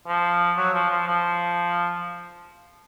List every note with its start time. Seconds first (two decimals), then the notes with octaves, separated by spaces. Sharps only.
0.07 F3
0.57 F#3
0.74 F3
0.90 F3
1.07 F3